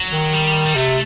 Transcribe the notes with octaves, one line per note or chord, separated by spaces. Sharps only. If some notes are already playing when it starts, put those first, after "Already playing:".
Already playing: F#3
D#3
G3
G3
C3 A3